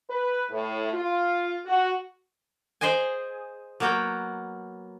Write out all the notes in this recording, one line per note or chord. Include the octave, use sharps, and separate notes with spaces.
B4
A2
F4
F#4
G#4 C5 D#5 G5 G#5
F#3 A#3 B3 F#4 G5